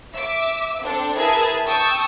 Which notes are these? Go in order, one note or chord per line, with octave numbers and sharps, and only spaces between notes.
E5 D6
C4 D4 A4
E4 G#4 A#4 B4 E5 A5
G5 A5 C#6 D#6 E6